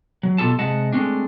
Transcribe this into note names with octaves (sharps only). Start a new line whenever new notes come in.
F#3
B2 F4 G4 A4 A5
C3 G#3 D#5 F#5 A5
G#3 A3 C4 D4